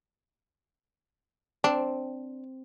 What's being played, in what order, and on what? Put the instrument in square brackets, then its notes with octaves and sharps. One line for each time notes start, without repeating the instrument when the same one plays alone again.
[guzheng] C4 [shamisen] D4